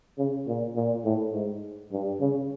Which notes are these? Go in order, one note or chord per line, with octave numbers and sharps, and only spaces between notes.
C#3
A#2
A#2
A2
G#2
G2
C#3